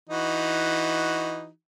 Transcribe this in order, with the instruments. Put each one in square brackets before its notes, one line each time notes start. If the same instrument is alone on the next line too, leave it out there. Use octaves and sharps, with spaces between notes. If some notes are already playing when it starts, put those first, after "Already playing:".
[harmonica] E3 D#4 F#4